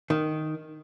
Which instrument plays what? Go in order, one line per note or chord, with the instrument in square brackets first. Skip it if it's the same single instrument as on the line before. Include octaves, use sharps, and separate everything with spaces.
[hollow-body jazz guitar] D#3